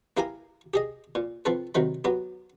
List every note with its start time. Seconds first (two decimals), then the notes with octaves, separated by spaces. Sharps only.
0.17 A#3 E4 G4 A#4 F5 G#5
0.74 G4 G#4 D#5
1.15 A#2
1.45 F3 C4 A4 B4
1.75 C3 D#3 F#3 B5
2.04 F#3 B3 G4